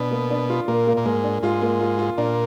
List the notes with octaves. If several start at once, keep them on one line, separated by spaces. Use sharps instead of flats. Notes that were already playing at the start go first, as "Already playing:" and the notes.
Already playing: B2 D4
A#3
D4
F4
A#2 A#3
A#3
A#2
G#2 A#3
D4
G#2 F4
A#3
F4
F4
A#2 D4